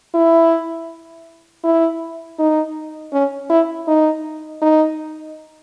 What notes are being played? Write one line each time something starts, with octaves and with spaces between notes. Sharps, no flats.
E4
E4
D#4
C#4
E4
D#4
D#4